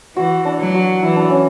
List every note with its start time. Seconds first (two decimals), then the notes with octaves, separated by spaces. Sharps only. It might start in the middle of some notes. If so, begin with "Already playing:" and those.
0.16 E3 F#4
0.45 D4
0.60 F#3
0.75 F#4
1.03 E3 E4
1.16 D4
1.30 C#4